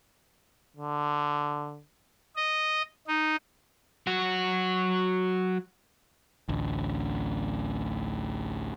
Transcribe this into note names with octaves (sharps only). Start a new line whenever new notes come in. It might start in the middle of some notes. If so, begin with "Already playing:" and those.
D3
D#5
D#4
F#3 F#4
A1 D2